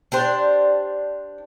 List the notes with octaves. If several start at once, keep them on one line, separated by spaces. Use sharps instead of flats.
D4 G4 C5